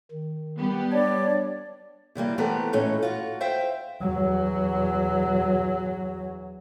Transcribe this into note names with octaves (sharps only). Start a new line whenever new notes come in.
D#3
G3 B3 G4
D4 C#5 D5
C3 E3 G3 A#3
E3 A3 B3 C4 G4 A#4
A2 E3 A3 C#4 D#4
F4 F#4
C5 E5 F5 G5
E2 F#3